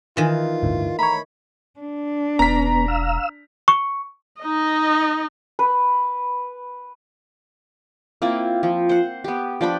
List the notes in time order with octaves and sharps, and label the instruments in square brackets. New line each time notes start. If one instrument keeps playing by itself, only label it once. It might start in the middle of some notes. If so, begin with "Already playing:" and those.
[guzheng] D#3 E3 [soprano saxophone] F4
[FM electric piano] G1 D2 A2
[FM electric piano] A3 C#5 [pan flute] A#5 [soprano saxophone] B5
[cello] D4
[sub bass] E1 [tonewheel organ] B3 [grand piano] A#5 B6
[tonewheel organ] F5 E6
[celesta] C#6
[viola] D#4 D#5
[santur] B4
[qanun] A#3 C4 E4 F4
F3
C5 F#5
B3 G4
F3 D4 G5 B5